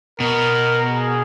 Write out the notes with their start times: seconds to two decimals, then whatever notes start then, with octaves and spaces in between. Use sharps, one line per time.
0.20 B2 A#4
0.88 G#4